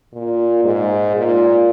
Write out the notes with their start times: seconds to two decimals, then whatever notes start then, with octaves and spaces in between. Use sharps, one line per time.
0.13 A#2
0.65 G#2
1.16 A#2